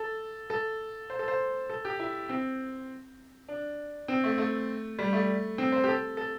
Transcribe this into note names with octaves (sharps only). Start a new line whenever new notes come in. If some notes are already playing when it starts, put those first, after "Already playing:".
Already playing: A4
A4
C5
A4
C5
A4
G4
E4
C4
D4
C4
A3
A3
G3
A3
C4
C5
G4
A4
A4